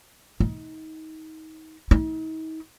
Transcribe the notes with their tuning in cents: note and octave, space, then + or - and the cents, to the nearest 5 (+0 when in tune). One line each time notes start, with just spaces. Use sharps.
D#4 +25
D#4 +40